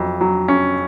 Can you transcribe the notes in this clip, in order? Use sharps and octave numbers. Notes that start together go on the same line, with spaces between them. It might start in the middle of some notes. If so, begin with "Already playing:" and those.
Already playing: F2 F#3
F#3
C#4